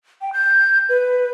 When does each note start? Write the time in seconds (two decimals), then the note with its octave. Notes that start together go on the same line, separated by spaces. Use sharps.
0.21 G5
0.33 G6
0.89 B4